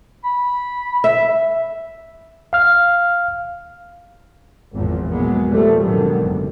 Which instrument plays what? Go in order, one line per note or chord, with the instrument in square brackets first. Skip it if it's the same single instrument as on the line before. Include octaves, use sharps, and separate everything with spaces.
[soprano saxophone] B5
[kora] E5
[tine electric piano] F5 F6
[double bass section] G#1 E2 A#2 F3
B2 F#3 G#3 A#3 B3
A#2 F3 G3 A3
F2 G#2 B2 D3 D#3 F#3
F#1